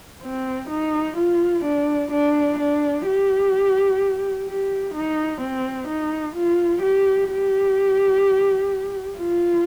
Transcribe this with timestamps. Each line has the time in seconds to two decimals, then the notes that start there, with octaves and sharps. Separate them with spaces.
0.23 C4
0.70 D#4
1.17 F4
1.65 D4
2.12 D4
2.59 D4
3.06 G4
4.47 G4
4.94 D#4
5.41 C4
5.88 D#4
6.36 F4
6.82 G4
7.30 G4
9.18 F4